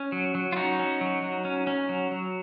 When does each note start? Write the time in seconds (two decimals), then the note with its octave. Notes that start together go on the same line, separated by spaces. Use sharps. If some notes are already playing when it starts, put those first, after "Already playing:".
Already playing: C#4
0.12 F#3
0.35 F#3
0.52 F4
0.56 C#4 D#4 F#4
0.79 C#4
1.01 F#3
1.22 F#3
1.45 C#4
1.67 C#4
1.89 F#3
2.11 F#3